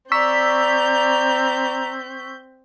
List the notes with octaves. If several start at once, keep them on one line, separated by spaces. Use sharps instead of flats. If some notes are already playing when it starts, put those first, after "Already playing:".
C4 D5 A#5 C#6 E6 G6 B6